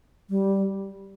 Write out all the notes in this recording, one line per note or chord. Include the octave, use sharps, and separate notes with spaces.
G3